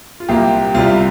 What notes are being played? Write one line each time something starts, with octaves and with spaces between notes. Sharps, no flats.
F4
C2 A#2 A#3 G4
C2 C3 G3 F4